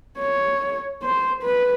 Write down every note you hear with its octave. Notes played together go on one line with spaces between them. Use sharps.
C#5
C5
B4